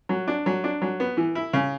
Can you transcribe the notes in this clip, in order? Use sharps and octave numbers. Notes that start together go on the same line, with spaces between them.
F#3
D4
F#3
D4
F#3
B3
E3
E4
C#3